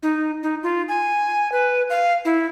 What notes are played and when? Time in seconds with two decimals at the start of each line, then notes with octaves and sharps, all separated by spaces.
0.03 D#4
0.43 D#4
0.63 F4
0.89 G#5
1.52 B4
1.90 F5
2.25 E4